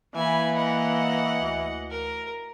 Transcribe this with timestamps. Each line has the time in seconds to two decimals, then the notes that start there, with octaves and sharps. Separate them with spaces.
0.15 E3 A#3 G#5 B5
0.56 D#5 F#5
1.41 D2
1.90 A#4